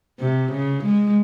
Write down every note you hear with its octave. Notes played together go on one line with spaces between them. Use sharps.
C3
C#3
G#3